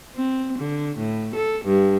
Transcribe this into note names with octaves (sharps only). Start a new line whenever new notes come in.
C4
D3
A2
A4
G2